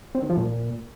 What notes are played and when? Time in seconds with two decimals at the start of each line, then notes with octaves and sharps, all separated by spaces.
0.15 C4
0.22 D#3
0.30 F3
0.37 A#2